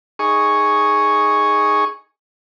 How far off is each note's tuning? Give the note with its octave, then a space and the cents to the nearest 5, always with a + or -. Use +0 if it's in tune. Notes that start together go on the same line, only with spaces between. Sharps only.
D#4 +0 G#4 +0 C#6 +0